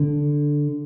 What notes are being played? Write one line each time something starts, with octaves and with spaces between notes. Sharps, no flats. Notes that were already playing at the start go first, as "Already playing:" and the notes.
Already playing: D3